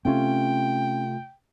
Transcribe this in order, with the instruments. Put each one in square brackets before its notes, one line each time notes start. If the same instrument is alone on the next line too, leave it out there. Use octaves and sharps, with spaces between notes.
[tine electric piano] C3 A3 F4 [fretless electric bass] C4 C#4 [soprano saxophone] G5